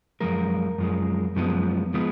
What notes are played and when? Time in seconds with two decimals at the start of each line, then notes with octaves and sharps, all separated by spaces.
0.21 F#2 F3 G#3 A#4
0.78 F#2 F3 G#3
1.36 F#2 F3 G#3 B3
1.94 F3 G#3 B3